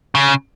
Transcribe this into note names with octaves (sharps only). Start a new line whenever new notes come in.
C#3